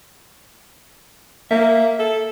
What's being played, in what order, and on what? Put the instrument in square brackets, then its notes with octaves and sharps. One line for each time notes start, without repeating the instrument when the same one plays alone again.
[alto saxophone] A#3 [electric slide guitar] E5
[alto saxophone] A4